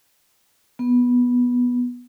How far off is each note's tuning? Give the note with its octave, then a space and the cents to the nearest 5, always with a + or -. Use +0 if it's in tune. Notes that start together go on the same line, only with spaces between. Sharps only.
B3 -10